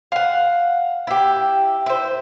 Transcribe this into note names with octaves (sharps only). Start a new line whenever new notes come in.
F5 F#5
E4 G4
E4 C5